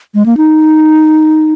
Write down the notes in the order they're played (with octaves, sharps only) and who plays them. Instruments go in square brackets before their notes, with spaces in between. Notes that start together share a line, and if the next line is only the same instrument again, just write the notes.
[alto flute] G#3
A#3
D#4